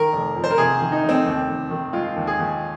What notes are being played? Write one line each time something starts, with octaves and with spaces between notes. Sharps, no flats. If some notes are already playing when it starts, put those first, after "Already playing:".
Already playing: D#3 A#4
F1
F2
C5
A#4
C3 G#4
D#3
D#4
F1
C4
D#2
D#2
D#3
G#3 F4
D#2
G#4
D#2